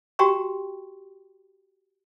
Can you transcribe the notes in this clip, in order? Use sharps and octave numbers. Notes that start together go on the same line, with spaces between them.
F#4 G4 G5 A#5 C6 C#6